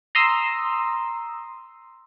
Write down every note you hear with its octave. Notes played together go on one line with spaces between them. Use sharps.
A#5 C6 D#6 E6